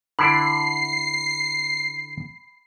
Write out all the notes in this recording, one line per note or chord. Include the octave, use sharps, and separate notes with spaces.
D3 E4 D5 B5 C7